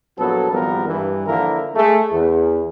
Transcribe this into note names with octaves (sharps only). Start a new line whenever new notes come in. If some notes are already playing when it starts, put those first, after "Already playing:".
A#1 F#3 B3 A4
G#1 F3 G3 B3 A#4
G2 E3
D3 F3 A#3 E4 A#4
G#3 A3
E2